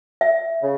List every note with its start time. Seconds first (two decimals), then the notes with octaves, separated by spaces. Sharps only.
0.21 E5
0.63 C#3